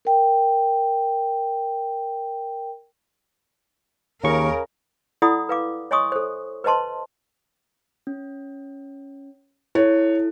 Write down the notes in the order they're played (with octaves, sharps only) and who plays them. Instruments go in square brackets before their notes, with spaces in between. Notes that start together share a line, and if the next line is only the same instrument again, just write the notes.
[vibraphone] A#4 G5
[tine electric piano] D#2 C#6 [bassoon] C#3 [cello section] A#4
[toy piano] E4 A4 D5 F#5 B5 D#6
B4 F5 D6
C#5 D#5 G#5 C6 C#6 D#6
A4 C5
B4 C5 D#5 A5 C6
[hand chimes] C#4
[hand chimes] E4 A4 [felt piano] C#5